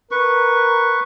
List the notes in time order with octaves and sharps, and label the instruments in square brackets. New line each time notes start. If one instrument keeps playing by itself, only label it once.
[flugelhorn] A#4 [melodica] B4 C#6